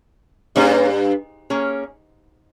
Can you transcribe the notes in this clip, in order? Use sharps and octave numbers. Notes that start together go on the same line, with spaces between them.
G2 A#3 C#4 G#4 C#5
A#3 C#4 G#4 C#5